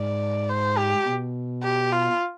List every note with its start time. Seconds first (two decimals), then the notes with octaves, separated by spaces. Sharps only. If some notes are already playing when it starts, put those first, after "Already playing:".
Already playing: G#2 D5
0.49 C5
0.78 G4
1.06 B2
1.63 G4
1.92 F4